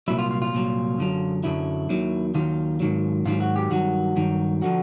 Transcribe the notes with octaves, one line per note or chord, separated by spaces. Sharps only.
C2 A#2 F#3 E4
F4
F4
F4
C2 A#2 F#3
F#2 D3 F#3
F#2 D3 F#3 E4
D#2 D#3 F#3
D#2 D#3 F#3 F4
G#2 D#3 F#3
G#2 D#3 F#3 F4
F#4
G4
G2 D#3 F#3 F#4
G2 D#3 F#3
D3 F3 F#4